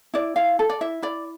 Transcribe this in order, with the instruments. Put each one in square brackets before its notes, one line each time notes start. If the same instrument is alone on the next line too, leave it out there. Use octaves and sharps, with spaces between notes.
[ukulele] E4 D5
E4 F5
A4
D5
E4 E5
E4 D5